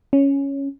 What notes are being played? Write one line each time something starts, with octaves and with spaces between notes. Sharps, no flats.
C#4